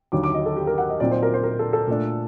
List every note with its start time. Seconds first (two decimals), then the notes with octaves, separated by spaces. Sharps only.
0.12 D#2 D3 F#3 D6
0.24 D6
0.34 D#5
0.46 A4
0.56 G4
0.67 A#4
0.78 F#5
0.90 D#5
1.00 A#2 F#3 C4 D#4 D5
1.11 C5
1.23 A#4
1.34 C5
1.44 A#4
1.59 A4
1.73 A4
1.87 A#2 A3 D4